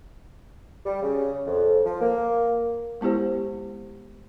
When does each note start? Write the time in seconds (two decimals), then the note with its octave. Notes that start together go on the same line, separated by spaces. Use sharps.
0.85 G3
1.02 C#3
1.46 F2
1.85 F3
2.01 A#3
3.01 G#3 B3 E4 G4 C5